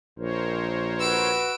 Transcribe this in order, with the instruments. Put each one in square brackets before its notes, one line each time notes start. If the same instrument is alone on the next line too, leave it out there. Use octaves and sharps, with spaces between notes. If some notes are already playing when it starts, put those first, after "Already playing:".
[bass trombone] A#1 [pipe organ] A#4 C5 C#5
[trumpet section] F#4 B4 [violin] E6 D7